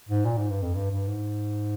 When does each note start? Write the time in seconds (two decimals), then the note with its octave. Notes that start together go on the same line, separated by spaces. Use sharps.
0.09 G#2
0.25 A#2
0.38 G#2
0.50 G2
0.62 F2
0.75 G2
0.91 G2
1.08 G#2